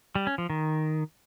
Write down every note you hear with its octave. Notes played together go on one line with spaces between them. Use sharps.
G3
C#4
F3
D#3